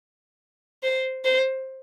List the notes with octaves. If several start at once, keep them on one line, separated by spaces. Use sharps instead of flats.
C5
C5